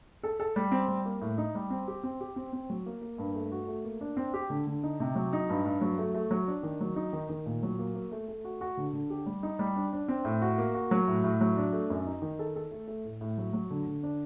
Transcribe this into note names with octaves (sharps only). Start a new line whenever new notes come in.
A4
A4
G3
C4
G3
A#3
A2
D#4
G3
C4
G4
C4
G4
C4
C4
F#3
A#3
A#3
G2
A3
F#4
A3
A#3
D4
C4
G4
D3
D3
D#4
C3
F#3
D#4
G2
G2
F#3
A3
A3
F#3
D4
D#3
F#3
D#4
D#3
D#3
A#2
F#3
A#3
A#3
A3
A3
F#4
F#4
D3
D3
G4
G3
D#4
G3
D4
D4
C4
A2
F#4
A#3
F#4
F#3
A2
A2
F#3
D4
A3
F#2
D#4
D#3
A4
A4
A3
A3
A2
A2
F#3
F#3
D3
D3
D4